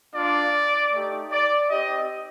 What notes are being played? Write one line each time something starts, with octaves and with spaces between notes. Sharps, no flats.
A#3 D4 F4 D5
A3 D#4 G4
D5
C4 D#4 G4 D#5